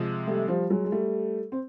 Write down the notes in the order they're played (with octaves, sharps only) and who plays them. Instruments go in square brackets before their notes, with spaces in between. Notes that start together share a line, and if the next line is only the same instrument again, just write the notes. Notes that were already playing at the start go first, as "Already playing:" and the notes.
Already playing: [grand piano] C3 F3 G#3
[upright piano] G3 A3
F3 G3
F#3 G#3
G#3
G3 A3
C4